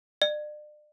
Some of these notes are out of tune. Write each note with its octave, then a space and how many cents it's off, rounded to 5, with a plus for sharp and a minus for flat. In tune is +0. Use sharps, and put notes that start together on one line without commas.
D5 +40